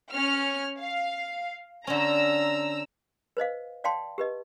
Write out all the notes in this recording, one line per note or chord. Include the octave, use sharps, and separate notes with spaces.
C#4 F6
F5
D3 C#4 A#5 E6
B4 C5 D#5 F5
D5 F5 G5 A5 C6
G4 B4 D#5